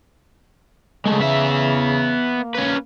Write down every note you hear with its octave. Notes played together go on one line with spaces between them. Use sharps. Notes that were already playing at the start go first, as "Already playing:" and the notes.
C#3 G#3 A3
B3 E5
A#3
C#4 B4